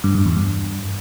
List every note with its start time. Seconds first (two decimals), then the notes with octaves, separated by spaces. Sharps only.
0.04 G2
0.15 G2
0.25 E2
0.36 G2